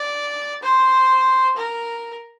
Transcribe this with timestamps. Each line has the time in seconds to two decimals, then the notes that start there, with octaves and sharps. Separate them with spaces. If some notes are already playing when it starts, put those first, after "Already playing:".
Already playing: D5
0.63 C5
1.57 A#4